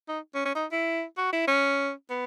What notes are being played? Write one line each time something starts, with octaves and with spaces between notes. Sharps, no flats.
D#4
C#4
C#4
D#4
E4
F#4
E4
C#4
B3